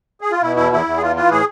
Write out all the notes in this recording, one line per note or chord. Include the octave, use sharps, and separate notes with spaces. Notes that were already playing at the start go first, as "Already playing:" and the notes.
G#4
F4
B2 E4
E2 E4
E2 E4
E2
G#4
E3 F4
E3 F4
A2 G#4